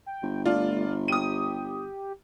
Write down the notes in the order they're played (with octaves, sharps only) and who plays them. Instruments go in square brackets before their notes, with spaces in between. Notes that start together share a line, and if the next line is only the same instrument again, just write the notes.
[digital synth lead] G5
[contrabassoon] G1
[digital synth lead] A3 [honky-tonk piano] D4 F4
[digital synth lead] G4 [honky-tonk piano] D#6 D#7